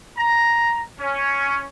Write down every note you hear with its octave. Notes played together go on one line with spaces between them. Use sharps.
A#5
C#4